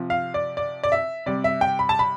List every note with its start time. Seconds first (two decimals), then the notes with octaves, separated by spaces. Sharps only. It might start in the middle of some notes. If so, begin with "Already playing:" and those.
Already playing: C3 F3
0.10 F5
0.34 D5
0.57 D5
0.83 D5
0.92 E5
1.26 C3 G3 D5
1.44 E5
1.61 G5
1.79 B5
1.89 A5
1.99 B5